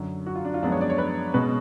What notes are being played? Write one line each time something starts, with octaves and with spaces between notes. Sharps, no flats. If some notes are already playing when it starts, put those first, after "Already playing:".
Already playing: F#2 D3 F#3
F#4
F4
D4
F4
F#2 F3 G#3 B3 D4
C#5
D5
C#5
B4
B2 G#3 C#4 B4